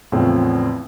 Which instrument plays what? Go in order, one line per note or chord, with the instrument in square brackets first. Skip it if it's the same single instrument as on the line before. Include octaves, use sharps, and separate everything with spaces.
[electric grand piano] E2 A2 C#3 F3 C4 C#4